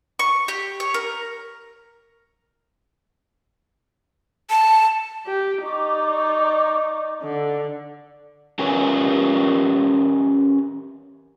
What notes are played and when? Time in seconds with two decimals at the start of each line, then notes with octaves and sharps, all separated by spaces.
0.19 C#6
0.48 G4
0.80 C#5
0.94 A#4
4.50 A5
5.26 G4
5.64 D#4 D5 C#6 D6
7.23 D3
8.59 C#4 G4 A#4 B4 G#5